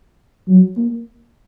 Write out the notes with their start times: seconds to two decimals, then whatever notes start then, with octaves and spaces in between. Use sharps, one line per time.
0.48 F#3
0.76 A#3